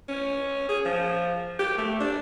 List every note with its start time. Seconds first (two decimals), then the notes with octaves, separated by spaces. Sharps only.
0.09 C#4
0.69 G#4
0.85 F3
1.59 G4
1.78 A3
2.01 D4